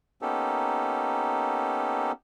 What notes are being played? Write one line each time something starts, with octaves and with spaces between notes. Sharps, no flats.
A#3 B3 C#4 D#4 G4 A4